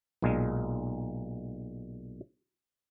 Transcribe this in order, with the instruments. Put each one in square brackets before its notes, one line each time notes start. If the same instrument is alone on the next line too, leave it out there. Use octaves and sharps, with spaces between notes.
[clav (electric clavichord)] B1 A#2 G#3